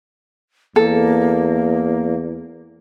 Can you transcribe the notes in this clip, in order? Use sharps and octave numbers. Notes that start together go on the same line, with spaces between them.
E2 A#3 A4